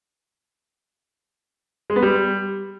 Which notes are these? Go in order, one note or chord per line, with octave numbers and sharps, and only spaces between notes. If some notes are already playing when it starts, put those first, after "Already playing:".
G#3
B3
G3